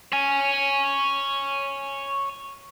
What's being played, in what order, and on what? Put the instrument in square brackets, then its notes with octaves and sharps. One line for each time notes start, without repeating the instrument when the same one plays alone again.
[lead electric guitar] C#5 G#5